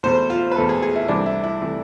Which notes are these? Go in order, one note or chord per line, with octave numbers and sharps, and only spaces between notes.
E2 B2 A3 C5
F4
B4
E2 B2 A3 A4
G#4
G#4
E4
C2 C3 E3 A3 D4
E4
E4
C3 E3 A3